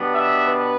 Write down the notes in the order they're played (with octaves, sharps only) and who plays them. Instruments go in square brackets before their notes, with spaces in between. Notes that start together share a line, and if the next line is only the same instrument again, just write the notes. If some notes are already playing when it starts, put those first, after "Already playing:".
Already playing: [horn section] B2 G3 B3 D4
E5
B4